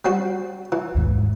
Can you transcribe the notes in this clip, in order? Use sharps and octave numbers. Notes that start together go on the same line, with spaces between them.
G3 C4 F#4
E3
D#2 G#2